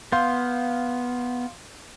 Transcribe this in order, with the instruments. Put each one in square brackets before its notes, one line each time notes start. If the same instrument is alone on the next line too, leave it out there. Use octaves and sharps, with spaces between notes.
[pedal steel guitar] B3 [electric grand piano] F5 C6 G6